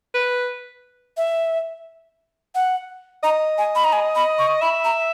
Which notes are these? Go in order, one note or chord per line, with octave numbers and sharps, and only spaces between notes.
B4
E5
F#5
D#5 A#5
G#5
B5
A#5
G#5
B5
C#6
E5 B5
A#5